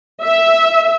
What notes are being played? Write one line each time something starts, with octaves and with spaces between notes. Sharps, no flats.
E5